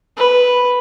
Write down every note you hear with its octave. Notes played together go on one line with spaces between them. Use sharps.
B4